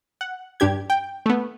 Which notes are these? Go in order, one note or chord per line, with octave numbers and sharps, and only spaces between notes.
F#5
G2 D4 G4 G#6
G5
A3 B3